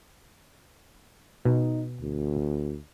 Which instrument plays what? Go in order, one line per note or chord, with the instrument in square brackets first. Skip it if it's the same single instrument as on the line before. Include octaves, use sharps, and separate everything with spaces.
[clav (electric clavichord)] B2 [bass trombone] D#4
[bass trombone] D2